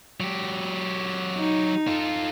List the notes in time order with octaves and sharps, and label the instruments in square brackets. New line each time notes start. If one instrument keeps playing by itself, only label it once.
[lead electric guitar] F#3 G4
[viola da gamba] D#4
[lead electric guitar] F4 A4